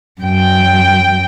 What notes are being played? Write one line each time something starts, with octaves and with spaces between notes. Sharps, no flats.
F#2 G5